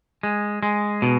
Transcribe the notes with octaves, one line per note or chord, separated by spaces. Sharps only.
G#3
G#3
B2